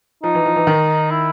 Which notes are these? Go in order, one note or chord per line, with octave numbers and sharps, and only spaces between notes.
F3 D#4
E3
F3
E3
D#3
E4